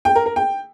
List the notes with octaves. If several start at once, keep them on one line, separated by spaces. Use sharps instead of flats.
G5
A#4
A#4
G5